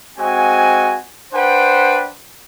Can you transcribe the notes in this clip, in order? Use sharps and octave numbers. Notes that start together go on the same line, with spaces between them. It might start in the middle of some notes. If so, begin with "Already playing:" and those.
G#3 C4 F#4 G#5
D4 B4 C5 F#5 G5